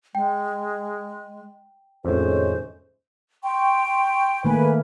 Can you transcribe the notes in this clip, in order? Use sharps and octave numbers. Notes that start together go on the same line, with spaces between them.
G#3 G5
F2 A2 D#3 G#3 C#4 C5
G5 C6 C#6
D#3 A3 A#3 B4 G#5